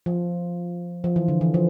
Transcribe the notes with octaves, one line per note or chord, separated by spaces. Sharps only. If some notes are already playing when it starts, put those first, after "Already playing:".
F3
F3
E3
D3
E3
F3